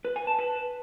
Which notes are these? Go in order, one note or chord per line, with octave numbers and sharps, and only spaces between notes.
B4
G#5
A5
B4